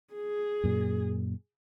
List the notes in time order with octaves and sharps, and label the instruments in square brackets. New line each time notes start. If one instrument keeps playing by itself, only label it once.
[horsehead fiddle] G#4
[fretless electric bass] F#2 A#2